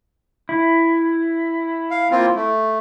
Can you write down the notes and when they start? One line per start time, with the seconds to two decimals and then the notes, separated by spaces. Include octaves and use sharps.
0.49 E4
1.91 F5
2.11 A#3 C4 F4
2.35 A3